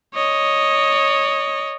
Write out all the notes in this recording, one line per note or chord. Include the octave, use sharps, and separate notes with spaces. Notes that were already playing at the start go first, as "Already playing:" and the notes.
C#5 D#5